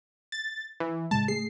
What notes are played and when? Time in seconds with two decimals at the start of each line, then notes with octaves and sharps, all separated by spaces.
0.32 A6
0.80 E3
1.11 A2 C#3 G#3 A5
1.28 A3 G#4 C7